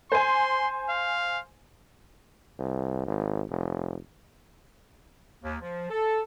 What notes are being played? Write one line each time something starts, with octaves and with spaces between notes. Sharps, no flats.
C5 G#5 C6
F5
C2
G#1
F1
D#2
F3
A4